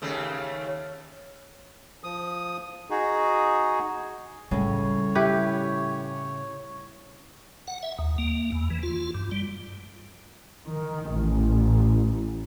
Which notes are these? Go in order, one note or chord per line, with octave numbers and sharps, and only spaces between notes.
D#2 C#3 A3
F3 D#6
D#4 F#4 G#4
A2 C#3 G3 C#5
E4 G4 B4
F#5
E5
D#2
A#3
E2
E3
F4
G2
G3
D#3
A1